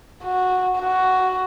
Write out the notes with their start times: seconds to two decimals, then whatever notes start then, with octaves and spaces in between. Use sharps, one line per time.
0.24 F#4
0.80 F#4